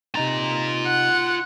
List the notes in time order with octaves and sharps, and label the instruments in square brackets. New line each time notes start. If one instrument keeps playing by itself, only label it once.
[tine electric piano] C3 D#4 A6 [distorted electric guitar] F4 A#5
[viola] F#5